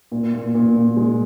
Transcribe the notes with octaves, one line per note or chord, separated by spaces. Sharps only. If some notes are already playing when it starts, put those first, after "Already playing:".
A#2
A#2
A#2
A#2
G#3